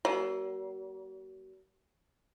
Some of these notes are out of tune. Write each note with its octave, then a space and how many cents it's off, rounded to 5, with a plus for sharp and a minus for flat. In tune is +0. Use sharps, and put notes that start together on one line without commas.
F#3 +40 A#3 +15